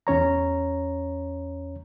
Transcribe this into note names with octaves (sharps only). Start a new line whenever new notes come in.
E2 C#4 C#5 A#5